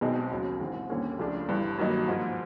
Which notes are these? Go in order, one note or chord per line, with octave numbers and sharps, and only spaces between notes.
B1 B2 G#3 C4 D#4
D#2 C#3 F#3
A1 G#2 E3 G#3 C4
D#2 D3 G3 A#3 C#4
C#2 C#3 F3 A3 D4
G1 G2 E3
G2 D#3 F#3 A#3 D#4
G#2 F3 A#3